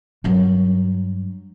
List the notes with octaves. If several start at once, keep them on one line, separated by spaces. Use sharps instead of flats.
G2 F#3